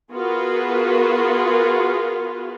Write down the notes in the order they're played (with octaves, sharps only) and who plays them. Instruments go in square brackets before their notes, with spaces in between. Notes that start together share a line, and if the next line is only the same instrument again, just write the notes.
[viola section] B3 F4 F#4 G#4 A#4 B4